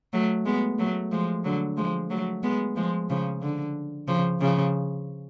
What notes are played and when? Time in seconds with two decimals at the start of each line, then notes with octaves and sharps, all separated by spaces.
0.13 F#3 A3
0.45 G#3 B3
0.78 F#3 A3
1.12 F3 G#3
1.44 D3 F#3
1.77 F3 G#3
2.10 F#3 A3
2.43 G#3 B3
2.76 F3 G#3
3.10 C#3 F3
3.42 D3
4.08 C#3 F3
4.40 C#3 F3